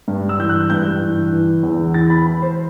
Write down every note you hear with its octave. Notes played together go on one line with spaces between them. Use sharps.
G2
E6
E3 G6
F#6
G2 G6
E3
E3
E2
E3 A6
B5
E3 B5
C5